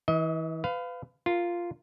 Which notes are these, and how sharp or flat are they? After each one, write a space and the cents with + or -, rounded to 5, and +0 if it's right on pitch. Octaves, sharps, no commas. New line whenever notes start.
E3 -30 D#5 +35
B4 +30 F5 +0
F4 -5 A#4 +0